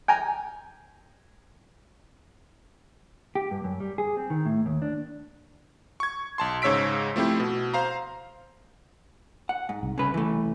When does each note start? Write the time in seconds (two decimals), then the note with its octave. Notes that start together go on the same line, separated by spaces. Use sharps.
0.08 G5 G#5 A#5
3.35 G4
3.51 G2
3.64 F#2
3.80 G3
3.98 G#4
4.17 C4
4.30 D#3
4.46 A2
4.66 D#2
4.82 D4
6.00 C#6 G#6
6.38 B1 A5 C6
6.62 G#2 C#3 C#5 E6 B6 D7
7.16 F3 A3 C4 E4 G4
7.40 B2
7.74 C5 F5 A#5
9.49 F#5
9.69 G#2
9.83 C2
9.98 C#3 B4
10.14 E3 A3